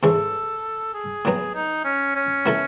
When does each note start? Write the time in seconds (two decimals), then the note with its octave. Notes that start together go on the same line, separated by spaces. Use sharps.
0.03 G#2 E3 G#3 C#4 A4
0.94 G#4
1.25 A2 F#3 B3
1.55 D#4
1.85 C#4
2.16 C#4
2.46 B2 A3 E4 A4